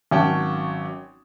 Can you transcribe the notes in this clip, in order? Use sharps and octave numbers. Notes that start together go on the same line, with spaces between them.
G#1 F#3 C#4 F#5 G5 A5